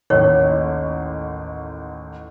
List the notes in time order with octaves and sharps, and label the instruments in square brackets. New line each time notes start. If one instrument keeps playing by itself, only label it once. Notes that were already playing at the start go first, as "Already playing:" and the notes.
[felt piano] A1 D#2 [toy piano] C#5